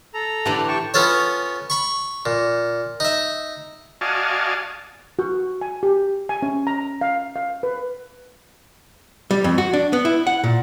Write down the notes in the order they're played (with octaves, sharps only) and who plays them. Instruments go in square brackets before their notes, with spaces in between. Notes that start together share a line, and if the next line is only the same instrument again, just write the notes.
[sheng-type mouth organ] A4 A#5
[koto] A2 D3 D4 [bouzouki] E3 G4
[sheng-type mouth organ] G5 A5 C#6
[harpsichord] B3 C#4 F4 A4 C#5
B5 C#6
A#2
D#4 E5
[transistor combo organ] F#4 D5 D#5 F5 G#5 A5
[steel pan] F#4
G#5
G4
G#5
C#4
A#5
F5
F5
B4
[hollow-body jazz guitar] G3
F2
F#4
D4
B3
E4
F#5
A#2